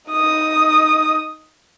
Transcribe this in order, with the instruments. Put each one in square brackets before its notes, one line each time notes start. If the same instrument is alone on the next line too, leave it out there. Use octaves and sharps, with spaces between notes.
[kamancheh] D#4 D#6